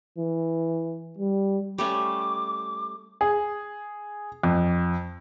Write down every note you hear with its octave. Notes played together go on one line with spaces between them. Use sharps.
E3
G3
G3 A3 C#4 D6
G#4
F2